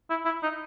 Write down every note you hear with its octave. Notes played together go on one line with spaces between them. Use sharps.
E4
E4
D#4